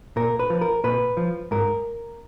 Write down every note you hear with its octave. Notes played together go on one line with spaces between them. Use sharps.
A#2 A#4
B4
F3
A#4
A#2 B4
F3
G#2 A#4